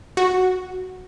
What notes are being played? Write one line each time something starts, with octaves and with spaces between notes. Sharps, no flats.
F#4